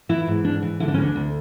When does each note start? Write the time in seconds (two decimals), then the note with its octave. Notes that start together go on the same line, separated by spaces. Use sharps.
0.09 E3 E4
0.27 G#2
0.45 G#2 D4
0.62 E3
0.80 D3 E4
0.88 D4
0.94 C#4
0.98 D2 D4
1.16 D2